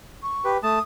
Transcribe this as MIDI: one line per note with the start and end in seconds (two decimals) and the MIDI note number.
0.23 0.52 85
0.45 0.58 67
0.45 0.58 71
0.63 0.79 57
0.63 0.79 81
0.63 0.82 87